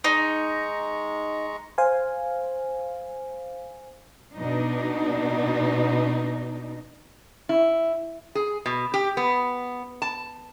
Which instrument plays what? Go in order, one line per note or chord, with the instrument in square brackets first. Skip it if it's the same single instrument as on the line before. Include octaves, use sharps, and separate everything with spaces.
[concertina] G#3 A#5 C#6 [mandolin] D#4
[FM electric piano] C5 F5 G#5
[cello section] B2 D4 D#4
[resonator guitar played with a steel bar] E4
G#4
B2
G4
B3
A5